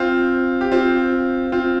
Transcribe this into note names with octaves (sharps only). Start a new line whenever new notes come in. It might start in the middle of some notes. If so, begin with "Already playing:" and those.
Already playing: C4 F4
G4
C4 F4
C4 F4